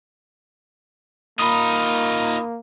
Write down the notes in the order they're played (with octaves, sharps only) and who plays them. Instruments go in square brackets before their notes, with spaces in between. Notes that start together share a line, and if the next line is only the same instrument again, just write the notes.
[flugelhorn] A#3 [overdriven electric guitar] D#4 F4 [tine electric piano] B5 D#6